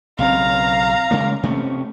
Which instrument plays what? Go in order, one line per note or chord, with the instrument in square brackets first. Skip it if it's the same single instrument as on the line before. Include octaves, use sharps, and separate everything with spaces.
[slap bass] B1 C#3 C4 [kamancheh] F5 A#5
[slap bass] C#3 G#3 A#3
C3 A3 C#4